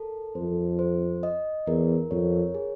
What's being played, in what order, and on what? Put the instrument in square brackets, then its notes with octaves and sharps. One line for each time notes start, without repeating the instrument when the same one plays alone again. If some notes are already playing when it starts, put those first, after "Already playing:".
Already playing: [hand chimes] A4 A#4
[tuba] F2 [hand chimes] C5
[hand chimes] C5
D#5
[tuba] E2 [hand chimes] A#4
[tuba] F2 [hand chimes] C#5
[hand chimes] G#4